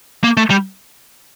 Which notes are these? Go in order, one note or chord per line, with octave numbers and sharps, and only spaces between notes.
A#3
A3
G3